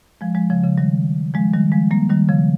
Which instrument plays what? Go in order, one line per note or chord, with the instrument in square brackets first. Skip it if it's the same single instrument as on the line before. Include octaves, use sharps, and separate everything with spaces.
[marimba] F3 G#3
F3 G#3
C#3 F3
C#3 F3
D#3 G3
F3 G#3
D#3 G3
F3 G#3
G3 A#3
D#3 G3
C#3 F3